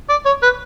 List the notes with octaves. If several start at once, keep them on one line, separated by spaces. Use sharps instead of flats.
D5
C#5
B4